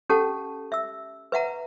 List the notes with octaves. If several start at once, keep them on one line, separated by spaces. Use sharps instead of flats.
C#4 G4 A4 F#5 A5
E5 E6
B4 E5 F#5 A#5